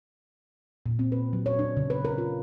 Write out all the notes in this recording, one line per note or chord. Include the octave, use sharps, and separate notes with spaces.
A#2
C4
B4
F#3
C#5
D4
C#3
B4
A#4
F4